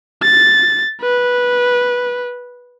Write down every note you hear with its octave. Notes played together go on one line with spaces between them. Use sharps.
A6
B4